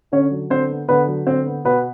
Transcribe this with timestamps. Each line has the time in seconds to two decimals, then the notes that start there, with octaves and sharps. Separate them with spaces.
0.12 D3 C#4 C#5
0.31 F#3
0.50 D3 C4 C5
0.70 B3
0.88 D3 B3 B4
1.07 F#3
1.27 D3 C4 C5
1.46 B3
1.65 B2 B3 B4